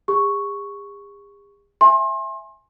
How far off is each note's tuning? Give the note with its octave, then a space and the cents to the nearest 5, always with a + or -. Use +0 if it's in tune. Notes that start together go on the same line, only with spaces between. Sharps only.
G#4 -45 C#6 +0
E5 +0 G#5 +0 C6 +35